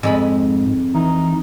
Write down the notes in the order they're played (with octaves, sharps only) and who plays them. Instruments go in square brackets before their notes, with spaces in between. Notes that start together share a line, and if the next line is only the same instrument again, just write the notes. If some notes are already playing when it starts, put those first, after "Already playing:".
[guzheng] F2 G#3 B5 [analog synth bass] G#2
[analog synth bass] E3 [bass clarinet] D#4